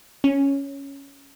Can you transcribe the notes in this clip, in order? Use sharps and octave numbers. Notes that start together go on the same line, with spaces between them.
C#4